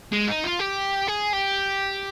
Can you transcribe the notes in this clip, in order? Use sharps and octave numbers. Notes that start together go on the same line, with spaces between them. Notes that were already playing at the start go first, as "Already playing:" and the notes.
G#3
D#4
F4
G4
G#4
G4